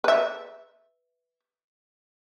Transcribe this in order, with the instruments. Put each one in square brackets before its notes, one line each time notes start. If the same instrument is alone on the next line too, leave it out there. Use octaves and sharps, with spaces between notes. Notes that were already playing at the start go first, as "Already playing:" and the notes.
[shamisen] B4 E5